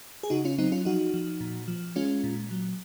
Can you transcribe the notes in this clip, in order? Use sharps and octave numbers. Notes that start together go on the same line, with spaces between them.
G#4
C#3 D#4 F#4
C#4 F4
F#3 C4 D#4
C#4 F4
F3 D#4 F#4
F3
A#2
F3
G#3 C#4 F4
A#2
F#3